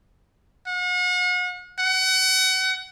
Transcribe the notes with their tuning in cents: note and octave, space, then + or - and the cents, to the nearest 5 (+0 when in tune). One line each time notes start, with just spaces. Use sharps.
F#5 -40
F#5 +30